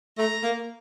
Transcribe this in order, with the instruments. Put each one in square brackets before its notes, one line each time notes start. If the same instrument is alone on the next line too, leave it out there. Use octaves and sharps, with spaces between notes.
[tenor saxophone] A3 [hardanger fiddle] A#5
[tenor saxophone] A#3